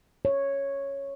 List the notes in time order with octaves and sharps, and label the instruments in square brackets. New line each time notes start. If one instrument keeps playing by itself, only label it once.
[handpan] C#5